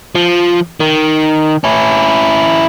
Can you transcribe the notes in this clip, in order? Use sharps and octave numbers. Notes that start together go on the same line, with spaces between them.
F3
D#3
C#4 E4